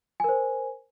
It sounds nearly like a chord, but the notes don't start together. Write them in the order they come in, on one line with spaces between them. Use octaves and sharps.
G#5 A#4 C5